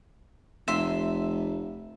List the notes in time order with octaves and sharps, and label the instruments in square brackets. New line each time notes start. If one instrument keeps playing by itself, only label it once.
[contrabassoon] F1 [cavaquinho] E5 C6